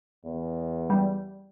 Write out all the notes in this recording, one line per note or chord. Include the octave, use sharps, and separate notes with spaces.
E2
G3